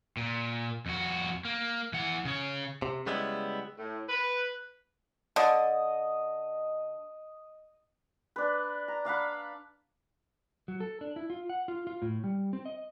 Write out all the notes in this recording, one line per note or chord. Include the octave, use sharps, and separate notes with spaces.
A#2
F2 F#4
A#3
E3 F#5
C#3 C#5
C3
C#3 G3 G#3 B3 E4
A2
B4
D3 D#5
D4 B4
A#5
D4 F5 F#5 B5
F#3
A4
D4
E4
F4
F#5
F4
F4
A2
G3
C4
D#5